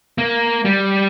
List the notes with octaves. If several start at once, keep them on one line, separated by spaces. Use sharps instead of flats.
A#3
G3